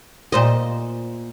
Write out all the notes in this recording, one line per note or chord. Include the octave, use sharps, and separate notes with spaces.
A#2 C5 D#5